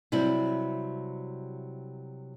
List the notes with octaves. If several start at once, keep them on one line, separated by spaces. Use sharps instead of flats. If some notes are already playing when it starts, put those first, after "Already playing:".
C3 F#3 G3 E4